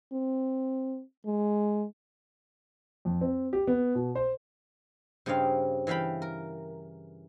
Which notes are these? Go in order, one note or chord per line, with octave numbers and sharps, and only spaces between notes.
C4
G#3
F2
C4
G4
B3
B2
C5
G2 C#3 C4 D#5 F5
E3 E5 F5 G5 B5
A#4